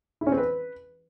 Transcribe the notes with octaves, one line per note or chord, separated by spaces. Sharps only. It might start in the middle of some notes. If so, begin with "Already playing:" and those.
E4
C#4
C4
B4